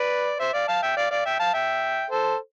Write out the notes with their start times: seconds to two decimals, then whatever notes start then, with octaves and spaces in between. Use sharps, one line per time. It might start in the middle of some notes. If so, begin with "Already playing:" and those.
Already playing: B4 D5
0.40 C5 E5
0.53 D5 F5
0.68 F5 A5
0.82 E5 G5
0.97 D5 F5
1.10 D5 F5
1.25 E5 G5
1.39 F5 A5
1.54 E5 G5
2.11 A4 C5